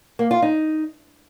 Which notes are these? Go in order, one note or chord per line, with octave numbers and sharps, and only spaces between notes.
A#3
F4
D#4